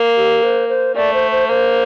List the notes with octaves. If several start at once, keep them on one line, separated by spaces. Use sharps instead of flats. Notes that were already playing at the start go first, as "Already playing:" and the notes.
Already playing: A#3
G4
C5
C5
A3 D5
C5
C5
A#3 C5